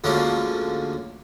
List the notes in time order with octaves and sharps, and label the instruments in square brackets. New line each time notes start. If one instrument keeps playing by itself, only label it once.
[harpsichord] D2 G#2 D3 F3 A#3 C#4